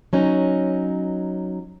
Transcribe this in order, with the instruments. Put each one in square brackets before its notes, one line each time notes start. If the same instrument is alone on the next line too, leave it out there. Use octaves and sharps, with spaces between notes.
[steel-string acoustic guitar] F#3 C#4 D#4